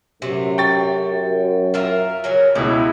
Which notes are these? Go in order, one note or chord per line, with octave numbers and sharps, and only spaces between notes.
F#2 C3 A3
G5 C#6 A6
F4 A#4 E5
C#3 F#3 A#4
C#2 B2 G#3 E4